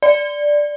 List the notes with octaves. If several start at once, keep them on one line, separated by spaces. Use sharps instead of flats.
D5